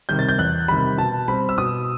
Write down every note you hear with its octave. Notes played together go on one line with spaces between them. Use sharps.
C3 D#3 G3 G6
A6
G6
E2 F#6
C3 D#3 G3 B5
B2 A5
G3 C4 B5
E6
B2 D#6